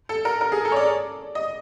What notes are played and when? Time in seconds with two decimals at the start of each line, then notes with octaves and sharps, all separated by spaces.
0.09 A4
0.25 A#4
0.41 A#4
0.52 G#4
0.65 A4
0.72 C#5
0.76 D5
1.35 D#5